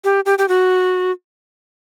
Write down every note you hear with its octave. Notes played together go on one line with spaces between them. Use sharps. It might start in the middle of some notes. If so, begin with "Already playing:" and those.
G4
G4
G4
F#4